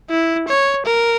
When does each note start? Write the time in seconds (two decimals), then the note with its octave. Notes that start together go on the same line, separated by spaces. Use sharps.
0.10 E4
0.48 C#5
0.85 A#4